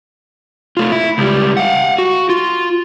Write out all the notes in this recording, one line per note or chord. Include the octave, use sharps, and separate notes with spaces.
A3 F4
E4
C#2 G3
F5 F#5
F#4
F4